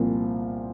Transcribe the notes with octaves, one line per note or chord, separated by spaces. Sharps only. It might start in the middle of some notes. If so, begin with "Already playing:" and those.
Already playing: C2 A#2 F3